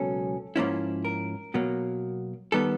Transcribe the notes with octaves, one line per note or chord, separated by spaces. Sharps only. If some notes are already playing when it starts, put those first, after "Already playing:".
Already playing: C#2 B2 F#3 A#3 C#4 A4
G#2 F3 A#3 C#4 E4
A#4
B2 F#3 A#3
D#3 G3 B3 A4